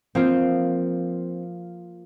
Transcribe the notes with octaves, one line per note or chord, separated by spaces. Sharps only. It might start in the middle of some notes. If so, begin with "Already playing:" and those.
F3 A#3 C4 F4